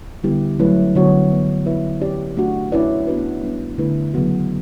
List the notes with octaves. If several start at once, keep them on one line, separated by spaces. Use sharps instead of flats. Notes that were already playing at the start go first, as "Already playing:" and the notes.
D3 G3 B3 E4 G4
F#3 A3 C#4 E4 B4
D3 F#3 B3 F#4 C#5
E3 B3 D4
B3 E4 B4 E5
C#4 G4 D5
A3 D4 F#4
C#4 E4 B4 D5
B3 D4 F#4 B4
G3 B3 D4
D3 A3 C#4 E4 B4
C#3 F#3 B3 F#4